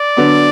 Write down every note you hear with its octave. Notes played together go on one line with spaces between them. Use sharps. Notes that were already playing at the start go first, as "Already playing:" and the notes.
Already playing: D5
D3 F#3 B3 D4